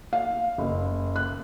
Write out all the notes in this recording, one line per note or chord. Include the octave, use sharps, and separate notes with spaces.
F5
F#1
F#6